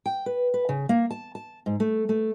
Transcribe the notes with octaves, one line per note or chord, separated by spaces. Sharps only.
G5
B4
B4
C#3
A#3
A5
A5
G#2
A3
A3